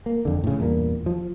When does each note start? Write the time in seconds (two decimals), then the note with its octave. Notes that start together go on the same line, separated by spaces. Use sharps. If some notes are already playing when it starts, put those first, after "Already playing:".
0.06 A#3
0.25 F2 D3
0.44 A2 C#3
0.60 E2 G2 A#2 A#3
1.06 F3